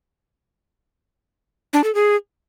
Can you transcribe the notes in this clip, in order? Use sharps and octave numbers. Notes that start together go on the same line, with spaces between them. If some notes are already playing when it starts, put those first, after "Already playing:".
D4
A4
G#4